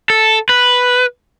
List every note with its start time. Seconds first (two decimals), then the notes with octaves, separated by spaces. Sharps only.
0.10 A4
0.49 B4